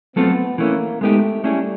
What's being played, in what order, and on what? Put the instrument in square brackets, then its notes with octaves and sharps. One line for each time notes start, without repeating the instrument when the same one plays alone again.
[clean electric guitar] F#3 A3 C4 F4 A4 [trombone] B3
[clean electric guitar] E3 A3 C#4 [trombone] A#3
[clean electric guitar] G#3 B3 D#4 G4 [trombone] A3
[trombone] G3 [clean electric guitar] A3 C#4 E4 G#4